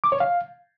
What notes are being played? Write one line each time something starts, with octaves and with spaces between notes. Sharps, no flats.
D6
C#5
F5